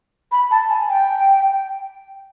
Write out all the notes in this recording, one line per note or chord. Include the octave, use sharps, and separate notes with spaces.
B5
A5
G#5
G5